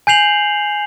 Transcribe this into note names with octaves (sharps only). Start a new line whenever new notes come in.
G#5 G6 C7 F7 F#7